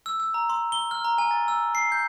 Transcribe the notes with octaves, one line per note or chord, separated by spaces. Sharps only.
E6
E6
A#5
C6
G7
F6
A#5
G#5
A6
E6
C7
G6